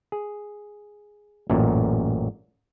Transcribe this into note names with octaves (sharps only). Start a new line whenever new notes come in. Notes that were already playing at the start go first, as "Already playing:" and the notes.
G#4
A1 F#2 A#2